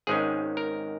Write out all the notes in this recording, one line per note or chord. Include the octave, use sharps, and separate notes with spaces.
G#1 G#2 D#3 G#3 C#4 G#4
A#4